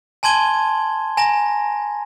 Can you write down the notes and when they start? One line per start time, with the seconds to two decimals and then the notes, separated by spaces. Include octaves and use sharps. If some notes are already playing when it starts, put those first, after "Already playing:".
0.23 G#5 A5 C6 G#6 D#7 G7
1.17 G#5 A#5 A#6